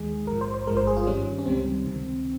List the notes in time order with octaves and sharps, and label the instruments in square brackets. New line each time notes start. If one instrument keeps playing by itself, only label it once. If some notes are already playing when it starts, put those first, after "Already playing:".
Already playing: [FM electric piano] D#2 D#3 G#3 G#4
A#1 G#2 F3 A#4
C5
C5
G1 G2 F3 G#3 A#4
C5
G#4
F4
G2 D#3 G3 C#4
C#4
C#2 C3 D#3 G3 C4
C#2 C3 D#3